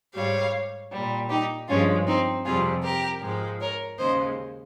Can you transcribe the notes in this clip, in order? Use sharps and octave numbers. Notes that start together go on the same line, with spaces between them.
G#2 G3 C#5 F5
A#2 G3
D#4 G4
G2 F3 G#3 C#4 F4
C4 D#4
F2 C3 G3 F4 G#4
G4 A#4
G#2 F3 G#3
A#4 C#5
D#2 C#3 G#3 C5 D#5